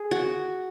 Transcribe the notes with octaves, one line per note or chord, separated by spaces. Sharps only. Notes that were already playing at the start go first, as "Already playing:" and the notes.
Already playing: G#4
F#4